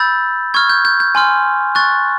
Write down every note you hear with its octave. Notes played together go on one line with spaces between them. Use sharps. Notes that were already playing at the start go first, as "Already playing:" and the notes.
Already playing: B5 E6 G6 A6
C#6 F6 G#6
G6
G6
G6
G#5 C6 F6
C#6 F#6 A6